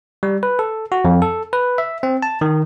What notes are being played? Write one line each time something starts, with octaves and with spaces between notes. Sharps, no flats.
G3
B4
A4
F#4
F2
A4
B4
E5
C4
A5
D#3